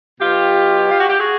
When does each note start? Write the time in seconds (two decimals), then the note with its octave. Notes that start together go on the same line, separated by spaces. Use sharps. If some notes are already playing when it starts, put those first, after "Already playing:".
0.20 B2 F#3 F4 G4
0.91 F4
1.00 F#4
1.09 G4
1.18 F#4 G#4